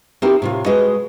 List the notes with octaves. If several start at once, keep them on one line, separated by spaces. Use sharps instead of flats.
C4 D#4 E4 F#4 G4 A#4
A2 C3 F4
G#3 F#4 B4 D#5